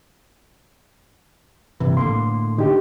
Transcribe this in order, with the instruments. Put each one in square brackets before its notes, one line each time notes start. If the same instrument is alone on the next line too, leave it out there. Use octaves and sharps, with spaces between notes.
[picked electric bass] G2 C3 E3
[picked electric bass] A2 D3 A#3 [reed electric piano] C6
[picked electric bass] D3 [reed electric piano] D#4 G4